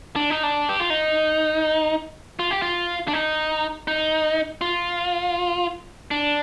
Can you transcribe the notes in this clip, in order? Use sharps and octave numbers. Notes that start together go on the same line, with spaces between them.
D4
D#4
D4
G4
F4
D#4
F4
G4
F4
D4
D#4
D#4
F4
D4